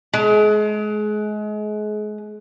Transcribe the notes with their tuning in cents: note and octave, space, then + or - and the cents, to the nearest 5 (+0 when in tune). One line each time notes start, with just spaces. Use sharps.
G#3 +30